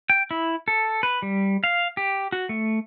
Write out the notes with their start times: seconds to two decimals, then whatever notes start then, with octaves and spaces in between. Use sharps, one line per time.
0.10 G5
0.31 E4
0.68 A4
1.03 B4
1.22 G3
1.64 F5
1.97 G4
2.32 F#4
2.49 A3